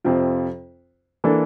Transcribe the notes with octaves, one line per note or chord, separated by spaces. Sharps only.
F2 C3 F3 C4 F4
E3 A#3 D4 A4